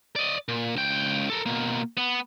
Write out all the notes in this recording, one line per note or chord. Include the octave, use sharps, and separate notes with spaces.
D5 D#5
A#2
C#2 G5
A4 A#4
B2 A#3
B3